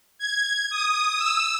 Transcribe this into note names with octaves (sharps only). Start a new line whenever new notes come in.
G#6
D#6
E6